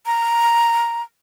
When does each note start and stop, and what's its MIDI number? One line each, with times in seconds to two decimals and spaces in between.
0.06 1.02 82